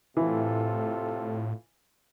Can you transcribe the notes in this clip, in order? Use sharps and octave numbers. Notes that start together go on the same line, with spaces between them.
A2 C3 E3 F4 A4